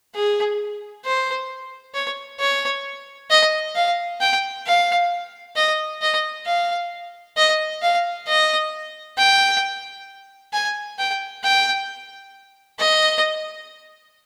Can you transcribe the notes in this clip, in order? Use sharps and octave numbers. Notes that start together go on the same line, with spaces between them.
G#4
C5
C#5
C#5
D#5
F5
G5
F5
D#5
D#5
F5
D#5
F5
D#5
G5
G#5
G5
G5
D#5